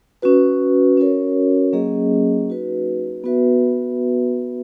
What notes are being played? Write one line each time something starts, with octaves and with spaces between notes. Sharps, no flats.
C#4 F#4 B4
C#4 F#4 A#4 C#5
F#3 A#3 C#4 G#4 D#5
D#4 F#4 B4
B3 F#4 B4 E5